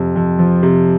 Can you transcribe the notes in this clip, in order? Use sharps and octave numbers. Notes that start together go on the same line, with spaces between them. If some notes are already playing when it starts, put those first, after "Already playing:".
Already playing: F2 C3
F2
F3
C3